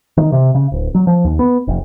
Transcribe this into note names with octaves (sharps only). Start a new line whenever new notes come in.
D#3
C3
C#3
D1
F#3
F3
D#2
B3
F1